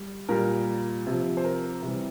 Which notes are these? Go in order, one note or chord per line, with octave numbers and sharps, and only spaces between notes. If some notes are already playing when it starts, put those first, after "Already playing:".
Already playing: G3
A#2 G3 A#4
C3 F3
C5
A#4
C3 E3 G3